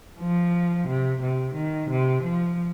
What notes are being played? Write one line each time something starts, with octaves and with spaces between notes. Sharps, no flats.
F3
C3
C3
D#3
C3
F3